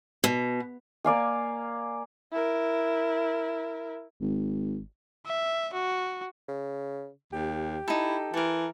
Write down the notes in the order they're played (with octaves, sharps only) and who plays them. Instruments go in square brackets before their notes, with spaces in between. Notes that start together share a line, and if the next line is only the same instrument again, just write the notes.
[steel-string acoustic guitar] B2
[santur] A#3 D5 F5 G#5
[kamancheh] E4 A#4
[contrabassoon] G#1
[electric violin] E5
F#4
[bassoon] C#3
[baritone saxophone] D#2 [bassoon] G4
[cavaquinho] D#4 A4 [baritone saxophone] E4
[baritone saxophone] E3 [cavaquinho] A4 A#4